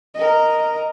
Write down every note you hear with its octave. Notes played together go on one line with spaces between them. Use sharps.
A#4 D#5